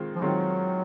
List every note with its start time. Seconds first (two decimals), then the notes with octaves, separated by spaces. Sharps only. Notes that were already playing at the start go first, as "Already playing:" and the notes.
Already playing: D#3 G#3 C4 F4
0.15 F3
0.21 D#3 F#3 G#3 C4 F4